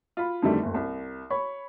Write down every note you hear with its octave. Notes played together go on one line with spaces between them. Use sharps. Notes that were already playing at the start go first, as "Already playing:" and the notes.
F4 B5
F2 D3 D#3 G3 A3
F#1 D2
C2
C#5 B5 C#6